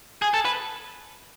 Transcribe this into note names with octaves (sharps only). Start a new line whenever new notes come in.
G#4
A4
B4